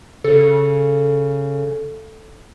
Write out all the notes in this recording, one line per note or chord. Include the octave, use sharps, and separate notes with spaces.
C#3 A4